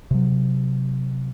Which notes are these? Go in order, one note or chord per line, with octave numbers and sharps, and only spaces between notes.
C3 F#3